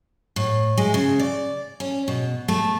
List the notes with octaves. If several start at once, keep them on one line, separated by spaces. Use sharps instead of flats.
A2
G#3
C#3
D5
C#4
B2
A3